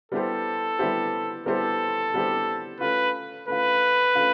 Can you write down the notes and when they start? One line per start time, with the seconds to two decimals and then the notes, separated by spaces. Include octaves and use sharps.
0.12 G3 B3 E4 G4 A4 C5
0.79 G3 B3 E4 G4 C5
1.46 G3 B3 E4 G4 A4 C5
2.14 G3 B3 E4 G4 C5
2.80 A3 C#4 F4 B4
3.48 A3 C#4 F4 B4
4.15 A3 C#4 F4